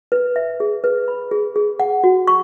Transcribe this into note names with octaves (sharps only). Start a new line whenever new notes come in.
B4
E5
G#4
B4
B5
G#4
G#4
F#5
F#4
C#6